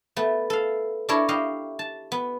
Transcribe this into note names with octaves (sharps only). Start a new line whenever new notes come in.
A3 B3
A4 F5
D4 E4 A4 A#4 C#5
E4 G4 D#5 F5
A5
B3